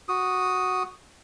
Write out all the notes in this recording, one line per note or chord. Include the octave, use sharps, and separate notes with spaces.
F#4 D#6